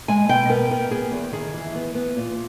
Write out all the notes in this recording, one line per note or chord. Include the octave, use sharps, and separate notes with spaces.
G#3 G#5
B2 G5
B3 A#4
B3 A#4
B3 G#4
E2
D#3 G#4
E3
B3
B3
A#2